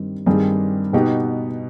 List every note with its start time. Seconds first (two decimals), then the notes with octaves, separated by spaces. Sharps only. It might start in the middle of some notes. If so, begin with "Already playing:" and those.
Already playing: G2 D#3 G3 C4
0.26 G2 D#3 G3 C4 G#4
0.93 B2 B3 D#4 G4